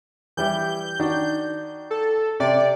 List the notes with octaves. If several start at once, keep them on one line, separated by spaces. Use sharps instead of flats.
E3 G3 E4 G6
D#3 D4 F#4
A4
C3 D5